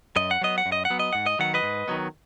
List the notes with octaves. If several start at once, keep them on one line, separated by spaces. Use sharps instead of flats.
F#2 D#5
F#5
F#3 B3 D#5
F#5
F#2
D#5
F#5
F#3 B3
D#5
G#2 F#5
D#5
D#3 F#3 B3 F#5
B4 D#5
G#2
D#3 F#3 B3